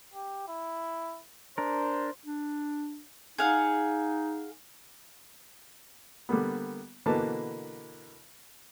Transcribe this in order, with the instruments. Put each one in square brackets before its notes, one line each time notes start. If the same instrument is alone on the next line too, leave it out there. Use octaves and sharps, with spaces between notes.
[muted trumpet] G4
E4
[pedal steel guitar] D4 A#4 [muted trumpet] C5
[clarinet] D4
[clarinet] D#4 [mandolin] G#4 F5 F#5
[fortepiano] D3 G3 A#3 B3
B2 D3 E3 A#3 B4 A5